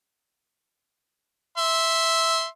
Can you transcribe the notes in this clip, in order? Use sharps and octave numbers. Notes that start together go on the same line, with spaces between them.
E5 C6